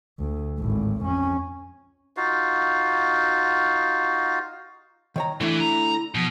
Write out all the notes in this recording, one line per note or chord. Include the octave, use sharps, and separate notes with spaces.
D2
G#1 A2
F2 C#4
D#4 F4 F#4 F5
D#3 C#5 A#5
D3 E3 A3 E4
A#5
B2 F3